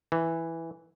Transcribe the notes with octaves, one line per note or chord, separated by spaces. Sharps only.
E3